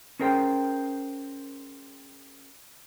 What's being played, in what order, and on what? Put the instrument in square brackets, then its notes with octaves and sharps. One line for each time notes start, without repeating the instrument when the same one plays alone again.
[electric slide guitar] C#4 G#4 A#4 C5 G5